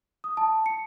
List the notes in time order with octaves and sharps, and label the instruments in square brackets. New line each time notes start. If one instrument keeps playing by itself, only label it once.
[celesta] D#6
A5
C#7